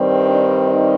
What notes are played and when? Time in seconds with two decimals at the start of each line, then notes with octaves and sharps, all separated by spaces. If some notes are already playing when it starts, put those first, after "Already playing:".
Already playing: G2 D#3 G3 C4
0.28 D4
0.66 D#4